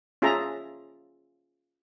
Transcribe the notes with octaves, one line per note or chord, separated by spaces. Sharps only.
C#4 F4 G#4 E5 A5 A#5